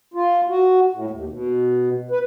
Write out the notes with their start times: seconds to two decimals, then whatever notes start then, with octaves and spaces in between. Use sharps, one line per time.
0.14 F4
0.49 F#4
0.93 A2
1.10 D#2
1.30 B2
2.11 B4